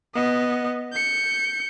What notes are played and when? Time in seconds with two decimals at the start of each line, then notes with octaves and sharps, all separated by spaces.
0.14 B3 D#5
0.92 G6 C#7